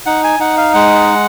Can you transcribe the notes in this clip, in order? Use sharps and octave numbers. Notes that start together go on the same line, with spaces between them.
D#4 F#5
G#5
D#4 F#5
F5
G#3 F#5